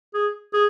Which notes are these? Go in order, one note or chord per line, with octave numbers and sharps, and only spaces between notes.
G#4
G#4